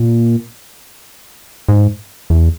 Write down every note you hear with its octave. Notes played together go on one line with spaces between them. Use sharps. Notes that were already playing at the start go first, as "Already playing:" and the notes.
Already playing: A#2
G#2
E2